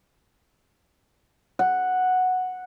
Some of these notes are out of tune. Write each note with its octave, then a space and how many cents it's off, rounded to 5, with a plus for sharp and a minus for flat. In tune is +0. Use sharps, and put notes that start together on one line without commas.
F#5 -5